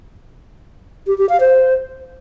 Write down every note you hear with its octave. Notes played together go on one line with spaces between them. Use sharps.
G4
G4
F5
C5